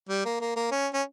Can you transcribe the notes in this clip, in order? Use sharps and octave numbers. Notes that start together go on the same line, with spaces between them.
G3
A#3
A#3
A#3
C#4
C#4